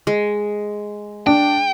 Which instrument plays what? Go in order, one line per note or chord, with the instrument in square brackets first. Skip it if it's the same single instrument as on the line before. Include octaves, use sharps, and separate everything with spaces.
[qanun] G#3
[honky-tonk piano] D4 [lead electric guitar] G5